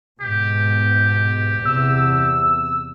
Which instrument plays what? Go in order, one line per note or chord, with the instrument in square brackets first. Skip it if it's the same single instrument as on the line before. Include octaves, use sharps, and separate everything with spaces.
[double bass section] G#2 B2 [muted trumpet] G4
[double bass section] E2 C3 [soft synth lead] E6